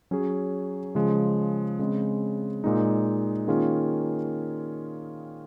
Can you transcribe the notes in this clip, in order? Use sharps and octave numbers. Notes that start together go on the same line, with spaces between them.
F#3 C#4 G#4
C#3 F3 G#3
C#3 G#3 C4
A#2 G#3 D#4
D#3 A#3 C#4 F4 G#4